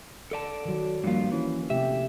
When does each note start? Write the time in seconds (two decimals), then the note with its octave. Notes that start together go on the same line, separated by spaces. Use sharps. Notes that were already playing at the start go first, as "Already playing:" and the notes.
0.31 A4 D5 A5
0.65 D#3 F#3
1.04 G2 F3 A#3 F4
1.32 E3 C#4
1.70 C3 A3 G4 E5